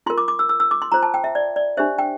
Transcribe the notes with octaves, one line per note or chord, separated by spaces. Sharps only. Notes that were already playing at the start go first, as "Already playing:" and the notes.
F4 A#4 C6
D6
D6
E6
E6
E6
D6
C6
F4 C5 A#5
A5
G5
E5
D5
D5
D4 G4 C5 E5
G5